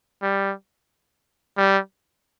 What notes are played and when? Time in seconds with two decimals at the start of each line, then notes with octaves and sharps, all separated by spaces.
0.22 G3
1.57 G3